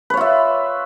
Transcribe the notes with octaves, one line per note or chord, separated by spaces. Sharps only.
F4 B4 C#5 E5